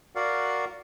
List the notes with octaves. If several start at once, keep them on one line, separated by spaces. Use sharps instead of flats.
F#4 A#4 D5 F5 F#5